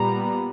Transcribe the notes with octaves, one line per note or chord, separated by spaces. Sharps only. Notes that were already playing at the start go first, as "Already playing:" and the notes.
Already playing: A#2 G3 B3 A#5